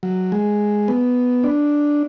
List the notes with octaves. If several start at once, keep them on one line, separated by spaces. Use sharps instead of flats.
F#3
G#3
B3
D4